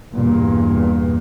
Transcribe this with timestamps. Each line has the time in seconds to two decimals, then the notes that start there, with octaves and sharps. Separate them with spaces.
0.14 E2 G2 A#2